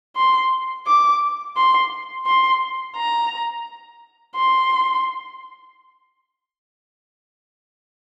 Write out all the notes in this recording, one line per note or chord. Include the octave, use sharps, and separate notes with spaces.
C6
D6
C6
C6
A#5
C6